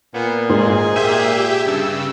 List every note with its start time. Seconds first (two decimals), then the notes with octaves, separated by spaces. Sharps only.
0.14 A#2 B3
0.49 G#2 G#4
0.96 A#2 G4 E5 G6 D#7
1.66 G2 C#3 E6